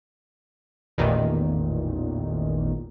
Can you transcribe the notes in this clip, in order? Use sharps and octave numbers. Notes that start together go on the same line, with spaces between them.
A1 E2 A#2 D#3